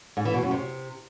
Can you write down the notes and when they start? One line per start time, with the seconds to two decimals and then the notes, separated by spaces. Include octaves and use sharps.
0.17 G#2
0.25 E3
0.34 B2
0.42 F#2
0.51 C3